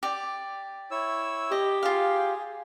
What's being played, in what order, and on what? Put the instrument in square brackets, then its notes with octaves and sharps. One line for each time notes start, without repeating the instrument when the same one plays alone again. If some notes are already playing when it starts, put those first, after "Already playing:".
[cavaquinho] G4 D5
[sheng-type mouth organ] E4 C#5 E6
[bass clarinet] G4 [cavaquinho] D#5
[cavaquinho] F4 F5 [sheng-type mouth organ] G#4